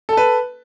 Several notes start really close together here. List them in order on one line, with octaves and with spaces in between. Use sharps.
A4 A5 B4